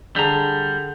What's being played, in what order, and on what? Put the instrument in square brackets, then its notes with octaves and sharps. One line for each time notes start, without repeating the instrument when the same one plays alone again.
[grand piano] D3 G#4 A5 [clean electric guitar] G3 A#5